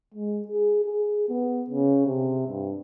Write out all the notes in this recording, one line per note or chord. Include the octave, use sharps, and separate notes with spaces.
G#3
G#4
G#4
B3
C#3
C3
G2